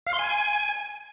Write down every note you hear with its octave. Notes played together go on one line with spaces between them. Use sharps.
F5
C6
G#5